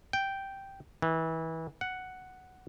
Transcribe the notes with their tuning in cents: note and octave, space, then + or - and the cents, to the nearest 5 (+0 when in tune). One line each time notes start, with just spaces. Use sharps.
G5 -5
E3 -25
F#5 +5